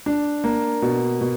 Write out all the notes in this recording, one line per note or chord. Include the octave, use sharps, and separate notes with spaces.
D4
A#3
B2
B2